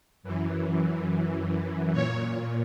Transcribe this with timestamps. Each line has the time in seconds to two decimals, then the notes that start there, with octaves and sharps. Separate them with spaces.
0.23 F#2 E3
1.92 A#2 C#5